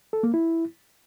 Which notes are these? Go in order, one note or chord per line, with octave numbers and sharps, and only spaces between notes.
A4
A#3
E4